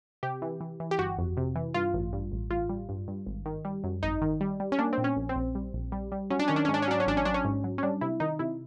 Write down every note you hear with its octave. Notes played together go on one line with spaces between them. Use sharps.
C3 G4
E3
E3
E3
G4
G1 F#4
F2
C3
E3
G2 F4
A1
G2
A1
A1 F4
G3
G2
G2
G#1
D#3
G3
F#2
G#1 D#4
D#3
G3
G3
C#4
A#3 D4
C4
A#2
C#4
A#1
C4
A#1
G3
A#1
G3
G3
F#3 C#4
D4
D#3 C#4
D4
G#2 C#4
D4
C#4
F#3 D4
C#4
A1 D4
C#4
F#3 D4
C#4
G#2
F#3
C#4
G3 D4
C3 E4
D#3 D#4
C3 E4